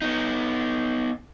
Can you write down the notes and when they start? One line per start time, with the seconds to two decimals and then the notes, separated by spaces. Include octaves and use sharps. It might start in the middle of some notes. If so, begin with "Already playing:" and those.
0.02 B3 D#4